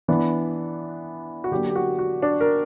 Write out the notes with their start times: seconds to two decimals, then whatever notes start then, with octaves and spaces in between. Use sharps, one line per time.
0.08 E3 B3 D4
1.44 F#4
1.51 D3 F#3 A#3 D4 G4
1.69 G4
1.76 F#4
1.99 F#4
2.22 D4
2.41 A#4